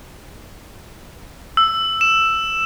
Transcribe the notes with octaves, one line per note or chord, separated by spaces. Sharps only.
E6
E7